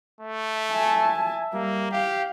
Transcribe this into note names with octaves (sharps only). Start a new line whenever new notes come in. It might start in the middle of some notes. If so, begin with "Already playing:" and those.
A3
E5 G#5 A5
G3 A#3
G4 F5